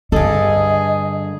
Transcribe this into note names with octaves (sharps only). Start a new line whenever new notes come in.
G2 D3 G#4 A4 D#5